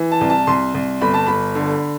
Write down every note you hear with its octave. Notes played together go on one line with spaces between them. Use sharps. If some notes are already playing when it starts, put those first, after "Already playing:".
Already playing: E3
A5
C2
A5
C2 C6
C2
G1 B5
A5
G1 B5
D3